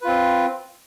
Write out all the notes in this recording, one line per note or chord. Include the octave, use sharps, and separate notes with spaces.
C4 F4 B4